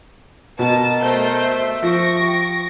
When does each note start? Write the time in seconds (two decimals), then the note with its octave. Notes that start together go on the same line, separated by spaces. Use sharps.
0.59 B2 A#4 D#5 A5
0.99 A3 C5 G6
1.48 E5
1.82 F3 C#6 A#6 D7
2.20 G4